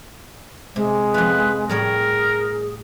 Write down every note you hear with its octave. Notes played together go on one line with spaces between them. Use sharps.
C3 G#3
F2 F4 B4
A2 G3 G#4 A#4 C#5